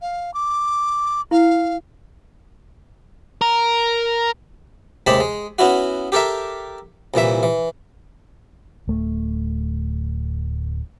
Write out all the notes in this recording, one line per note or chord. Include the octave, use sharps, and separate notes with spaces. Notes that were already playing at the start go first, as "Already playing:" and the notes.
F5
D6
E4 F5
A#4
D#2 C3 G#3 G4 A5 B5
G#3
B3 C#4 E4 F#4
G4 A4 A#4 E5
C2 A#2 E3 E5
E3
D1 A3